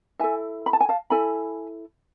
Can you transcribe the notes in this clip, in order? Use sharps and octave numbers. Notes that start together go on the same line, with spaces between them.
E4 A4 E5 G#5
B5
A5
G#5
F5 A5
E4 A4 G#5 B5